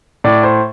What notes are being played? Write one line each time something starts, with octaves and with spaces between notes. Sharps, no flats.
A2 D5
C5